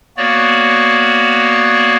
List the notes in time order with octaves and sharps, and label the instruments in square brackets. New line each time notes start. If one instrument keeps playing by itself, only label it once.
[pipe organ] A#3 B3 F#4 C#5 D5